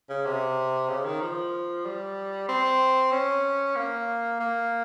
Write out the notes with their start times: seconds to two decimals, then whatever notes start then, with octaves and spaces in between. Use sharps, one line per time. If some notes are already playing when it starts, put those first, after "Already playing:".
0.10 C#3
0.25 C3
0.89 C#3
1.05 D#3
1.22 F3
1.85 G3
2.49 C4
3.12 C#4
3.76 A#3
4.40 A#3